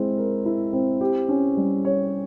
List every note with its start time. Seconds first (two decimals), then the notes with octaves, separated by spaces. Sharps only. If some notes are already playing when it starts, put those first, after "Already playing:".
Already playing: G#3 C4 E4
0.17 A#4
0.45 E4
0.73 C4
1.01 G4
1.29 C#4
1.57 G3
1.85 C#5